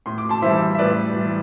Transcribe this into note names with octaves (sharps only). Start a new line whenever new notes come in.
A2 C6
D6
A5 C6
E3 G3 C5 E5
E5
A2 B4 D5
E3 G3